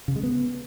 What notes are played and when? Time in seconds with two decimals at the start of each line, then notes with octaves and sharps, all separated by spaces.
0.08 C#3
0.16 G#3
0.23 B3